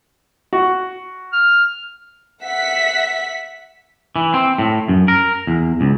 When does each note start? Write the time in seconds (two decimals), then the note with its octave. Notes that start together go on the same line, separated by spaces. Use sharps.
0.53 F#4
1.33 F6
2.43 E5 F#5 B6
4.16 E3
4.34 C4
4.59 A2
4.88 F#2
5.08 A#4
5.47 E2
5.81 C#2